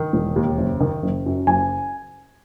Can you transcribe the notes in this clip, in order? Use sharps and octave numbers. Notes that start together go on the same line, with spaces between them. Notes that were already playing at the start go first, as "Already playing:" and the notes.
Already playing: D#3
E1
D#2
F#1
D#3
F#1
F#2
F#1 G#5